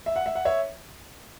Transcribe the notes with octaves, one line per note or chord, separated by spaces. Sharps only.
E5
F#5
E5
F#5
C#5 E5